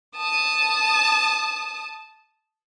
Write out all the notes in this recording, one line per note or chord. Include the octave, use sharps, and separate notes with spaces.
A5 D#6